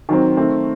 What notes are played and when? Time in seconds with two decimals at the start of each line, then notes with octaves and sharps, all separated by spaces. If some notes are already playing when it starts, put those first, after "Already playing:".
0.09 D#3 F#3 C4
0.37 D#3 A3 C4